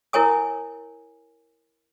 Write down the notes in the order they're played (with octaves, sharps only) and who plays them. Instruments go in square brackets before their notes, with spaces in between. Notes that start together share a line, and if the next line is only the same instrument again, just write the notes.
[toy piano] E4 A#4 C#5 G#5 D#6